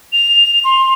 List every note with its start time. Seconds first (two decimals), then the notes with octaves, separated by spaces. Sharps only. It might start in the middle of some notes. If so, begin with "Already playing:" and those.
0.13 F7
0.64 C6